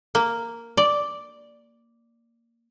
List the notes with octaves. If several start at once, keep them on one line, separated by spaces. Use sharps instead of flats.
A#3
D5